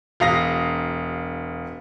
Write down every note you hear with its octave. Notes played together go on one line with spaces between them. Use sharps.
E1 F5 D#6 A#6